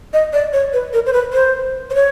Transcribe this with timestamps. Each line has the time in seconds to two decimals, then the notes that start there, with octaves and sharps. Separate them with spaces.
0.13 D#5
0.33 D5
0.53 C#5
0.73 B4
0.93 A#4
1.06 C5
1.13 B4
1.33 C5
1.90 C5
1.95 C#5